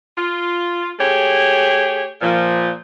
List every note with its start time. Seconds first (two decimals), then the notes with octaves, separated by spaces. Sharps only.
0.17 F4
0.99 A3 G4 G#4 C#5
2.21 A#2 F3